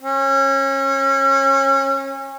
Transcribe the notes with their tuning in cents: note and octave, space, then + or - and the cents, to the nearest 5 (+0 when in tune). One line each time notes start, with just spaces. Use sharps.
C#4 -30